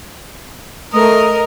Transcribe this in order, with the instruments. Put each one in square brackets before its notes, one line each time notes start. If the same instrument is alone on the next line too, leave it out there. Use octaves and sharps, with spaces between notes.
[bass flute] A3 [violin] A#4 [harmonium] D#5